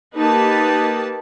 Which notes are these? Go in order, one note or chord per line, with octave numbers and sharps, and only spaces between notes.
A#3 D#4 G4 B4 A5